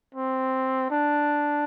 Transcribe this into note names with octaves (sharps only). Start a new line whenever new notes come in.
C4
D4